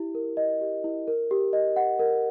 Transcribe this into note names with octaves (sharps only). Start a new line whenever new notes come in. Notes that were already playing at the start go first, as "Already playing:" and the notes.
Already playing: E4 G4
A#4
D#5
G4
E4
A#4
G4
D#5
F#5
A#4